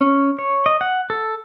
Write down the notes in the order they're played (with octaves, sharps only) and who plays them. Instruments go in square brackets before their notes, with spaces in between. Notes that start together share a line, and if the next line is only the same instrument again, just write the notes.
[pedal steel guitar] C#4
C#5
D#5
F#5
A4